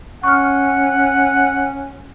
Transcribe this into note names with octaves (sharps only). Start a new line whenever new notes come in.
C#4 F#5 C#6 F6